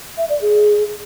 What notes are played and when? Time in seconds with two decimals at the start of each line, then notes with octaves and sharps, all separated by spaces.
0.18 E5
0.29 D5
0.41 G#4